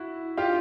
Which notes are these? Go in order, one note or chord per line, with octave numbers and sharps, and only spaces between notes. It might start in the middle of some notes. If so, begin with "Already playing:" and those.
Already playing: E4 F#4
F4 G4